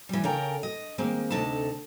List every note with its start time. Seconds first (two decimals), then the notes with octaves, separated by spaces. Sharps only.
0.09 E3 G3
0.24 C#3 C#4 A4 A#4 G5 A#5
0.63 D#5
0.98 D#3 G#3 A#3 C4
1.31 D2 C3 D#4 A4 A5